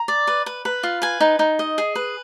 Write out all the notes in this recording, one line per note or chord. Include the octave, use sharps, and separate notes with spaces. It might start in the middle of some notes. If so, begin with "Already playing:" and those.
Already playing: A#5
D5
B4
B4
B4
F4
B4 G#5
D#4
D#4
D#5
G#4
B4